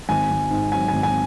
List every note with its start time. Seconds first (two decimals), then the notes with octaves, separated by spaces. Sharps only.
0.09 G#1 G#5
0.30 G#1
0.51 G#2
0.72 F#3 G#5
0.88 G#1 G#5
1.03 G#5